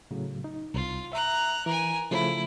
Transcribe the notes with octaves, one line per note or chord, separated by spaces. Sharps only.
A2 C#3 F#3
D#4
C2 F4
E5 A#5 F#6
E3 A#4 G#5
C#3 F3 A3 E4